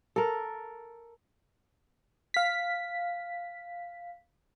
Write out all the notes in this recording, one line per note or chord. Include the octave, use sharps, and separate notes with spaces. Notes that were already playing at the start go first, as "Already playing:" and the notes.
A4 A#4
F5 B6